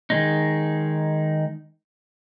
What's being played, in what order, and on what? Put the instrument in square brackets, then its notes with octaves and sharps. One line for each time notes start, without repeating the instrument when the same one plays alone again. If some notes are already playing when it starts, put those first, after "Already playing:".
[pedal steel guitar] D#3 G#3 D#4